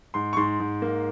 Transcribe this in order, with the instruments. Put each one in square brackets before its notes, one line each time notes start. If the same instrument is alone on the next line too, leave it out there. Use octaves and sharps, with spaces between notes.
[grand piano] G#2 C6
C#6
G#2 C6
G#2
A#3